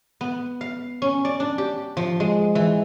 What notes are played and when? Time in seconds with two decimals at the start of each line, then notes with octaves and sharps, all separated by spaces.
0.21 B3
0.61 F5
1.02 C#4
1.25 D5
1.40 D4
1.58 G4
1.97 F3
2.20 G#3
2.55 E3